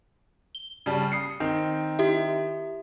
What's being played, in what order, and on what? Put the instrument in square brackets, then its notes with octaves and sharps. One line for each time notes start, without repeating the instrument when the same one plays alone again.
[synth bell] G7
[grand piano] C#3 G3 A5
D#6 C7 C#7
D#3 C4
[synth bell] E4 G4 E5